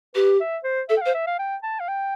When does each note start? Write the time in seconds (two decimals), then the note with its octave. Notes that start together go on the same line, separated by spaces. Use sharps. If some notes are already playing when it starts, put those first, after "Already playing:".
0.15 G4 B4
0.40 E5
0.64 C5
0.89 A4 E5
0.97 G5
1.02 F5
1.06 C5
1.14 E5
1.27 F5
1.39 G5
1.63 A5
1.80 F5
1.88 G5